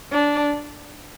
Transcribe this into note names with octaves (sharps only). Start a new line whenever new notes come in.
D4